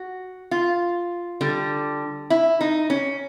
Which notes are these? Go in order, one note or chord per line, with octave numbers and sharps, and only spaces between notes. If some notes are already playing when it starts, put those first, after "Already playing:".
Already playing: F#4
F4
D3 G3
E4
D#4
C#4